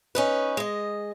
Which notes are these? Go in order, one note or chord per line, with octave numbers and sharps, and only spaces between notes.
C#4 D#4 B4
G#3 D#5